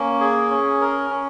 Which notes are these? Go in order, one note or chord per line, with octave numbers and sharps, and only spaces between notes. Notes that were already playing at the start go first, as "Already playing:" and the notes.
Already playing: A#3 C#4
G#4
C#4
A#4
C#4